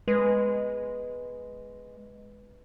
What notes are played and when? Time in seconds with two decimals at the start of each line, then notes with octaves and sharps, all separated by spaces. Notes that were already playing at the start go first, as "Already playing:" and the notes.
0.08 G#3 B4